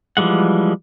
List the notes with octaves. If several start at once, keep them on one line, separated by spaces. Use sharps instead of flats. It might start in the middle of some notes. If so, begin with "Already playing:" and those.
E3 F3 G3 G#3 F#5